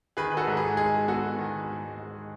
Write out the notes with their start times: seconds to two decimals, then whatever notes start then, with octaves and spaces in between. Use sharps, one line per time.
0.17 D#3 G#4 B4
0.32 B4
0.37 F#4 A4
0.47 G#2
0.57 G#4
0.77 G#3 G#4
1.07 B3 F#4 A4
1.39 D#3
1.69 G#2
1.99 G#3